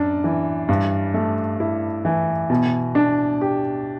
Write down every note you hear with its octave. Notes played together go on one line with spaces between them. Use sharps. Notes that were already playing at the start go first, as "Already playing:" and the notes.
Already playing: F#2 D4
E3
G2
A3
E4
E3
B2
D4
G4